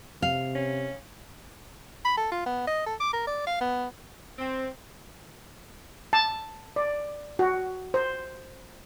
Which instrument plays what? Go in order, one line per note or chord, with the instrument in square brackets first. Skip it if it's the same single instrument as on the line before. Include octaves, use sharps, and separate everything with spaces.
[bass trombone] C3 [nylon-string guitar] F5
[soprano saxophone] C#4
B5
A4
F4
B3
D#5
A4
D6
A#4
D5
F5
B3
[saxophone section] C4
[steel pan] A5
D5
F#4
C5